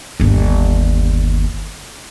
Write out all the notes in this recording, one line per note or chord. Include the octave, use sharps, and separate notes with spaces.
G1 D#2